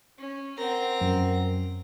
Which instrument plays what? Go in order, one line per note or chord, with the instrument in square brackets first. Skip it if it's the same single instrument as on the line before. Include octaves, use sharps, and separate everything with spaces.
[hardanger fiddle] C#4
[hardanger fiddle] C4 A#5 [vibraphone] A#4 F#5
[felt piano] F#2